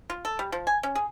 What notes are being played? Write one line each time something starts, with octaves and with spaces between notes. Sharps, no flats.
F4
A4
G3
F3
G#5
C#4
G#4